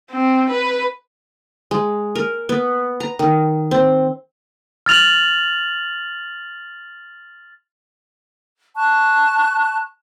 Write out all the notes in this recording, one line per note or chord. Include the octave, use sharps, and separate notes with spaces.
C4
B4
G#3
A#4
B3
A#5
D#3
C4
F6 A6 F7 F#7
A5 C#6 F#6